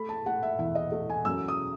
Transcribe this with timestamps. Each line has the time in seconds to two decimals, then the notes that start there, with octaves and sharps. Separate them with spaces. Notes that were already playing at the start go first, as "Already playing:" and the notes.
Already playing: A3 B5
0.09 A5
0.26 A3 F#5
0.43 E5
0.59 E2 E5
0.75 D#5
0.92 A3
1.10 G#5
1.25 F#2 E6
1.48 D#6